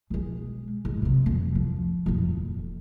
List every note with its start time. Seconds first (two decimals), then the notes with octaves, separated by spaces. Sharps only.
0.10 B2 G#3
0.85 G#2
1.02 F#2 C3
1.26 F2
1.55 F3
2.06 D#1 F2